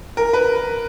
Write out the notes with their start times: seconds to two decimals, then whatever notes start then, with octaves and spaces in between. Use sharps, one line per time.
0.17 A#4
0.33 B4